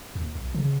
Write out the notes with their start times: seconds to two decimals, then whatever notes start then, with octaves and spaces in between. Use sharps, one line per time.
0.15 D#2
0.35 B1
0.54 C#3